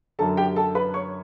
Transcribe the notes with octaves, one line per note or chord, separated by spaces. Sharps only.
F#2 D3 F#3 A4 A5
G4 G5
A4 A5
B4 B5
C#5 C#6